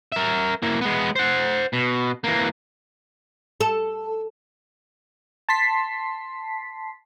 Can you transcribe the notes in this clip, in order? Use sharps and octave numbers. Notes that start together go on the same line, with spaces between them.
A#4 E5
A#3 E4
G#3 B3
C5 F#5
B2
E3 A#3
A4
A5 C6 B6 C7